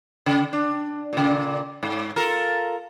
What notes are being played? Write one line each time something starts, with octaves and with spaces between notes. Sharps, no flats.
C#3
D4
A#2 C#3
G#2
F4 A4 A#4